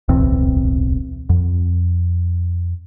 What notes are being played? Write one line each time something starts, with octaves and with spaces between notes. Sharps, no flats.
D1 B1 E2 C4
F2